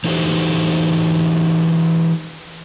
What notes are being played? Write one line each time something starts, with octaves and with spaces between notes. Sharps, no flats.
E3 D#4 F#4 G4 A4 C5